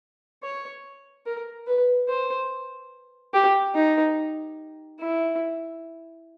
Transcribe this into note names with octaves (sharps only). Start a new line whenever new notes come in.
C#5
A#4
B4
C5
G4
D#4
E4